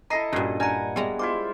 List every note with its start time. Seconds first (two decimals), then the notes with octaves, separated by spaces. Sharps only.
0.10 E4 A4 D#5 A#5 A#6 C7
0.33 G2 A#2 C#4 D4 F#4
0.60 A#4 D5 F#5 G#5 A#5
0.96 G3 G#3 B3 A#5
1.19 E4 F4 C5 D6